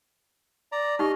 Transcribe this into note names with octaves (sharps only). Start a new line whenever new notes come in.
D5 A#5
D#4 G4 D#5 F6